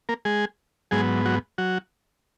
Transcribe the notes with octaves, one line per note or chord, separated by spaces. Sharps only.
A#3 A#4
G#3 G#4
G#2 F#3 G#3 B3 G#4
F#3 F#4
F#3 F#4